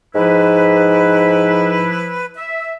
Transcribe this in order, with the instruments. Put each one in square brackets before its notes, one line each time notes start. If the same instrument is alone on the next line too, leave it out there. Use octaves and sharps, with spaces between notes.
[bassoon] G#2 [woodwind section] F3 E4 B4
[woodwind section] E5